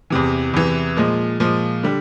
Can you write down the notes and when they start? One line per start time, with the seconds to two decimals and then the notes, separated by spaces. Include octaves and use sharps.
0.10 E2 C3 E3
0.53 E2 C3 E3
0.97 A#2 F3 G#3
1.40 A#2 F3 G#3
1.83 D3 G3